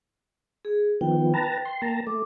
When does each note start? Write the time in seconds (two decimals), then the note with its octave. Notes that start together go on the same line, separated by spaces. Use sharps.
0.65 G#4
1.01 D#3 F3 B3 G5
1.34 B4 A5 A#5
1.65 C6
1.82 A#3 A5 A#5
2.07 A3 D6